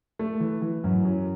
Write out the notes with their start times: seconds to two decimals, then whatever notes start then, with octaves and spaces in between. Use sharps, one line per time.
0.19 A3
0.40 E3
0.62 E3
0.84 F#2
1.05 F#3